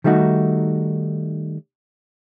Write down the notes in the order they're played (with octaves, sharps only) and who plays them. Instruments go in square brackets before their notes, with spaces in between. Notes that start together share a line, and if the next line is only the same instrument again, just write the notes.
[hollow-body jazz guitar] D#3 G3 A3 D#4 F#4